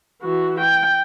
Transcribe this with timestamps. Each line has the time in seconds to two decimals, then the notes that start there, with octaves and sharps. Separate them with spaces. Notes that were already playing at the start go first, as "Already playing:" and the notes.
0.22 E3 F#4
0.60 G5